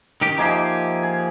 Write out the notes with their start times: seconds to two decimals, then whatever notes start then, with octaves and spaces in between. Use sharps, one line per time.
0.21 D#3 C#4 G4
0.38 F3 A#3 D#4 G4 G#4 E5
1.03 G#4